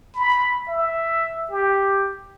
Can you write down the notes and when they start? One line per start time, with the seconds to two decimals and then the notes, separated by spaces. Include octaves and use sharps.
0.15 B5
0.68 E5
1.51 G4